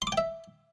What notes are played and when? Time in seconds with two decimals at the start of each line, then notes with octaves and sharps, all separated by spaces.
0.02 C6
0.07 D6
0.12 G5
0.17 E5